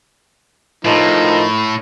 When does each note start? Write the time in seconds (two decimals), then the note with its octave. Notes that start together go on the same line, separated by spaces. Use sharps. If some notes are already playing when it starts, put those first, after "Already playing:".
0.85 A2 F3 D#4 A#4